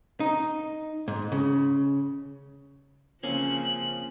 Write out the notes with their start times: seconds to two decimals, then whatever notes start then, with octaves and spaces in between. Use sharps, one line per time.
0.20 D#4
1.08 G#2
1.32 C#3
3.23 C#3 F3 A#3 C4 C#4 F#7